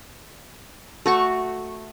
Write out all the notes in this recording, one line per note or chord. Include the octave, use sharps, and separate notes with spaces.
A3 F#4 C#6